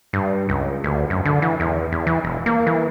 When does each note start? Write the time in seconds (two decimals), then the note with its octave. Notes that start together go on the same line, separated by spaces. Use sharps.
0.13 G2
0.49 C#2
0.84 D2
1.10 F#2
1.25 D3
1.42 E3
1.60 E2
1.92 E2
2.07 E3
2.24 E1
2.46 A#3
2.67 E3